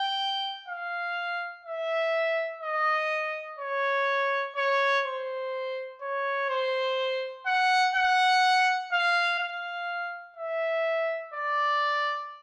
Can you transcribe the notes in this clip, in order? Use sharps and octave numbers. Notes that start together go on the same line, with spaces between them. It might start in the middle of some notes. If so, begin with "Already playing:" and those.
Already playing: G5
F5
E5
D#5
C#5
C#5
C5
C#5
C5
F#5
F#5
F5
F5
E5
D5